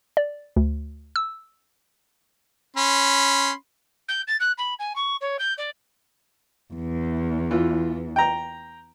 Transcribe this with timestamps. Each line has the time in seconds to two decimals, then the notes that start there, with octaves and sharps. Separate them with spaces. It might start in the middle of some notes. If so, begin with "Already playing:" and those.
0.17 D5
0.56 D2
1.16 E6
2.77 C#4 B5 C6
4.08 G6
4.27 A6
4.40 F#6
4.58 B5
4.79 G#5
4.95 C#6
5.21 C#5
5.39 G6
5.58 D5
6.74 E2
7.51 E3 F4
8.16 G5 A#5